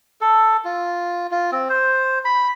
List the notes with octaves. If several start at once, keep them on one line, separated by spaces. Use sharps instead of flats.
A4
F4
F4
C4
C5
B5